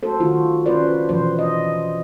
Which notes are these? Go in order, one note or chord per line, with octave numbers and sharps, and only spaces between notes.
F#4 A4 C5
D#3 F4 F#4
C#4 F4 B4 C5 D5
B2 E3 F3 B4 C5
D#5